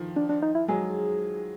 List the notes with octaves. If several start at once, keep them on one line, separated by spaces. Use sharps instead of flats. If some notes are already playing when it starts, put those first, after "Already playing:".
Already playing: D#3 F3
D4
D4
D#4
E4
F#3 G#3 G#4